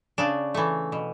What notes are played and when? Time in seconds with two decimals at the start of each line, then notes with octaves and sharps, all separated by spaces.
0.18 C#3 D4
0.54 E3 A3
0.92 B2